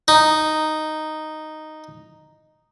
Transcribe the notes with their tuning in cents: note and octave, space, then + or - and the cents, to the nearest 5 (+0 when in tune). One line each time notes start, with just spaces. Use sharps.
D#4 -5